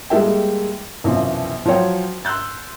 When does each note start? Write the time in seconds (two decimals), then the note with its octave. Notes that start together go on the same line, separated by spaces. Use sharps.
0.10 G3 G#3 A#3 A4 E5 G5
1.04 C2 F#2 B2 E3 F3
1.66 F3 F#3 C#5 G5
2.25 C6 E6 F#6 G6 A6